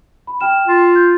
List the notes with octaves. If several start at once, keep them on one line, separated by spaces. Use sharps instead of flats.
B5
G5 F6 E7
F4
G6